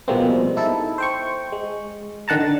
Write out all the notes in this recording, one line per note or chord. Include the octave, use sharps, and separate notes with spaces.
B2 F3 G3 G#3 A#3 C4
D#4 E4 A4
C5 G5 C#6
G#3
D3 D#3 F#5 A5 A#5
D3 A6